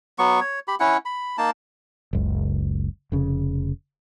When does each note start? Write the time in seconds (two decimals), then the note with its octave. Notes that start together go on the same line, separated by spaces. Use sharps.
0.19 F#3 B3 C#6
0.41 C#5
0.68 G4 B5
0.80 C#4 E4 F#5
1.05 B5
1.38 A#3 D#4 A5
2.13 F#1 C#2
3.12 F1 C#3